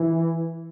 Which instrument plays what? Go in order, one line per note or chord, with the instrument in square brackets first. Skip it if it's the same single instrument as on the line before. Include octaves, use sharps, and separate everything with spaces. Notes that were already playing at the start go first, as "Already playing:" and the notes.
Already playing: [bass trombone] E3